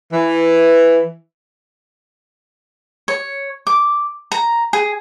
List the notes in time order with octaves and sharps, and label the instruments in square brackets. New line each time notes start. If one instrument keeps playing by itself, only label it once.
[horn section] E3
[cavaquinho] C#5
D6
A#5
G#4